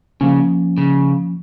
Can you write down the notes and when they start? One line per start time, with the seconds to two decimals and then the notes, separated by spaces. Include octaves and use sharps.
0.21 C#3 F3 A#3 C#4
0.78 C#3